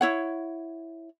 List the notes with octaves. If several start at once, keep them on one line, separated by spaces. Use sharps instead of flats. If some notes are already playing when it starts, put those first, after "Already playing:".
E4 C#5 F#5